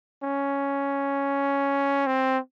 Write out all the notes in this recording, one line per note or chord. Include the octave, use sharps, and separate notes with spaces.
C#4
C4